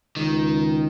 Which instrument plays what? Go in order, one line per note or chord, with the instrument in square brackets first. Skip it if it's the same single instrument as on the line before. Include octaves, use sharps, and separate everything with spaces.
[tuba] C#2 [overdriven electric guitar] D#3